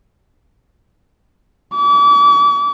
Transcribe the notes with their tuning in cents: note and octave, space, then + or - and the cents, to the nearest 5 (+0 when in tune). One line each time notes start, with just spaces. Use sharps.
D6 -35